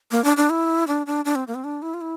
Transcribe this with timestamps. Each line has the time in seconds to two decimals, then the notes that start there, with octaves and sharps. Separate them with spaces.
0.11 A#3
0.24 D4
0.37 D4
0.50 E4
0.87 D4
1.07 D4
1.25 D4
1.35 C4
1.47 A#3
1.55 C4
1.64 D4
1.82 E4
1.94 F4
2.01 E4